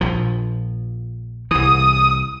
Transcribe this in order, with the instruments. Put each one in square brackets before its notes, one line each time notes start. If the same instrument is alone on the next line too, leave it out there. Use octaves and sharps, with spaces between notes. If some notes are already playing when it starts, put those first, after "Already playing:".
[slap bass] A#1 F3
[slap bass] C2 E3 [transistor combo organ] D#6